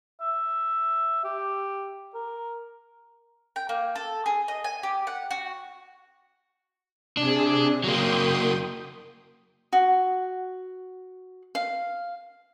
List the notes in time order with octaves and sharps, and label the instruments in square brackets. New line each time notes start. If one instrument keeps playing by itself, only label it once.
[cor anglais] E5
G4
A#4
[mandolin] G5
A#3
A4
G#4
D#5
G#5
G4
F#5
F#4
[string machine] C3 G#4 [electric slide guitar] D4
[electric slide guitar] F#3 A#3 [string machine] G5 C6 D#6
[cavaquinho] F#4
F5